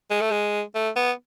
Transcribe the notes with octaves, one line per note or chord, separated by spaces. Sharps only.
G#3
A3
G#3
A3
B3